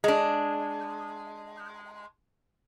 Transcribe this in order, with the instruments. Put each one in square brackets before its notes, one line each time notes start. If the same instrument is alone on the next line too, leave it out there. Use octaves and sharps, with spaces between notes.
[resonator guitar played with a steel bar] G#3 D4